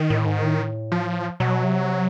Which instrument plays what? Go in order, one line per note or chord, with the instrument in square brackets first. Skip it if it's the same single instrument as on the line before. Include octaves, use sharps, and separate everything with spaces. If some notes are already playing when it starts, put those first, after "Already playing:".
Already playing: [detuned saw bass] D#3
[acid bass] A2
G#2
A2
[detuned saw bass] F3
[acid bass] B2 [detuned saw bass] F#3
[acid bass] C3